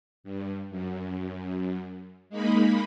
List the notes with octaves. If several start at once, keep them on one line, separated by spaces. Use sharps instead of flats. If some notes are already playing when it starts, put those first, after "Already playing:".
G2
F#2
G#3 A#3 D#4 B5